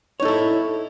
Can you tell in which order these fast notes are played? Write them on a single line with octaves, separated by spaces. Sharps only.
C#5 D#4 A4 E4